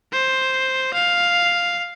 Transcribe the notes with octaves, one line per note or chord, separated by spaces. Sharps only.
C5
F5